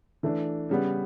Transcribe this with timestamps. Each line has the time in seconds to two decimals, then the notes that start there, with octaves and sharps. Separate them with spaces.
0.23 E3 A3 D4
0.69 C#3 G3 B3